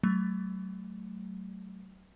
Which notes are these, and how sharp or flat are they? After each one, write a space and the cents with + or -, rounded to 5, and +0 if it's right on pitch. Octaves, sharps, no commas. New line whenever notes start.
F#3 +30 A3 +0